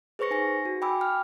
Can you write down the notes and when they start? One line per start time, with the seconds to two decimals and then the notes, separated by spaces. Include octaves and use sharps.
0.19 G#4 B4 C5 C#6 A#6 C#7
0.31 D#4 G#5 A#6
0.65 F#4
0.82 G5 G#5 B5 D6 E6
1.01 G5 F6